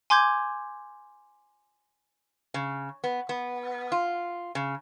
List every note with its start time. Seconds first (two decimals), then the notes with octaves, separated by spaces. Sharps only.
0.10 G#5 C6 D6 G6 G#6
2.54 C#3
3.04 B3
3.29 B3
3.92 F4
4.55 C#3